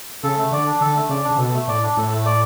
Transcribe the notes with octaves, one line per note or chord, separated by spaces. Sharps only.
C#3 A4
A3
D3 D5
D4
D3 A4
A3
C#3 D5
D4
C#3
B2 A4
A3
A2 D5
D4
A2 A4
A3
D5